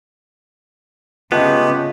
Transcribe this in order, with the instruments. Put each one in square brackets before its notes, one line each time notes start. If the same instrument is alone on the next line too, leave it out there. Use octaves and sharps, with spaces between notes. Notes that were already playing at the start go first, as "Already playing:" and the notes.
[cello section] C#3 [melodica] G#3 A3 G4 [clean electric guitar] B3 [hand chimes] F4